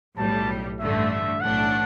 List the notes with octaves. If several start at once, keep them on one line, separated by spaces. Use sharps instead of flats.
B1 A2 G3 A5
A1 G2 D3 A3 E5
E5
B1 A2 E3 A3 D4 F#5